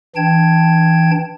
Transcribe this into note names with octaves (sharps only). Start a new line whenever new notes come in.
E3 D4 G5 A5 G#6